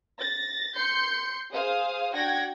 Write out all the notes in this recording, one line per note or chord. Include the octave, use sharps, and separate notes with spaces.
A6 A#6
C6 G6 C7 C#7
G#4 C5 F5 D#6
D4 F#4 F#5 G5 G#6 A#6